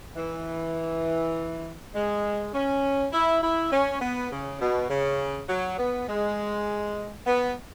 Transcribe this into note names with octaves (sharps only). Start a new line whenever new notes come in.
E3
G#3
C#4
E4
E4
C#4
B3
C#3
B2
C#3
F#3
B3
G#3
B3